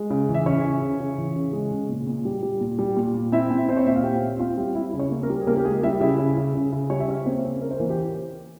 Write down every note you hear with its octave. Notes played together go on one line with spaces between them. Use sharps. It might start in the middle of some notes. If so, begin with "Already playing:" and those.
Already playing: G#3
C#3
E3
E5
C#3 C#4 C#5
C#3
C#3
C#3
E3
C#3
G#3
C#3
A#2
A#2
G3
G3
A#2
G3
A#2
A#2
C4 E4 E5
C4
C4 C5
C#5
A#2 E5
F5
A#2 G4 G5
C4
C4 F4 F5
G3
G3 E4 E5
C#3
C#4 C#5
A#3
A#3 A#4
G3
G#4
C#3 A#3 A#4
G4
G#3 A#3 G#4
G3 E4 E5
C#3 E4 E5
C#3
C#3
C#3
C#3
G3 C#5
E5
C#3 C#4 C#5
A#3 C4 C5
C#3
C#4 A#4
C5
E3 A#3 A#4
G4